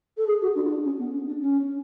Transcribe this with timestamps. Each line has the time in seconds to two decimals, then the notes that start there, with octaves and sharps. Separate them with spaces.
0.17 A4
0.27 G#4
0.42 F#4
0.55 D4
0.65 F4
0.70 D4
0.84 C#4
0.98 B3
1.13 C#4
1.26 D4
1.40 C#4